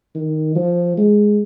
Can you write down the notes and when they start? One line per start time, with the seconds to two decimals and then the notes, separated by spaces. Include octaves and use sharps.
0.15 D#3
0.55 F3
0.97 G#3